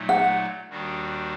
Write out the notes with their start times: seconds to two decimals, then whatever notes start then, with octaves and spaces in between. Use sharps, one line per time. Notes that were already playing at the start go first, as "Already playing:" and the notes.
Already playing: A#2 F#3 A3 D#4
0.09 F#5
0.70 D#2 D#3 G3 D4 F#4